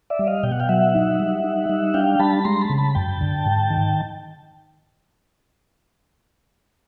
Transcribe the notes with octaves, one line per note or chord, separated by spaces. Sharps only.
D5 E5
G3
D#5 F5
B2 G5
F#5
F5 G5
F#3 E5 F#5
D#4
G3
D#4
G3
D4 F5 G5
G3 A5 B5
G#3 A#5 C6
A5 B5
C#3
A5 B5
F#2 G5 A5
D3
G#2
D#3